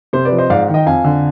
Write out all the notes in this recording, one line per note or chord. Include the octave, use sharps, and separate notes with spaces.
C3 C5
B4 D5
F3
C5 D#5
G#2 D5 F5
D#3
D#5 G5
F2 F5 G#5
D3